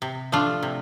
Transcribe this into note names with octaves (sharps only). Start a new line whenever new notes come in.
C3
F3 A3 D4 F4
C3